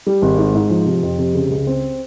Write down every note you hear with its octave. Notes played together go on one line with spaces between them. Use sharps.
G3
G#1
G#2
G#2
F3
C3
F2
C3
C#3
C#2
C4